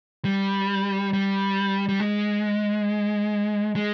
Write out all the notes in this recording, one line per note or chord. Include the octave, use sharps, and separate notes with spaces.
G3
G3
G3
G#3
G#3